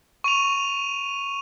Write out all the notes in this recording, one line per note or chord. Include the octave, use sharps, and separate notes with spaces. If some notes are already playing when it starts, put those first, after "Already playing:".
C#6 D#7 F7